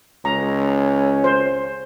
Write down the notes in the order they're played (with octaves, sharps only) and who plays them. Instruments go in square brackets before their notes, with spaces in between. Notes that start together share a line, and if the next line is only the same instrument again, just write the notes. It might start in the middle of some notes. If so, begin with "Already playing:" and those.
[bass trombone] C#2 [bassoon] C#4 [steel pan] A#5
[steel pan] C5